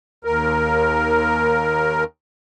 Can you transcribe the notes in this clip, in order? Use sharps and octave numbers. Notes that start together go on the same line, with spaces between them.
D#2 A#4